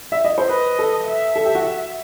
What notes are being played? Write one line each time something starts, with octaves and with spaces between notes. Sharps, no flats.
E5
D#5
C5
B4 D#5
A4
E5
A4
G4
F#4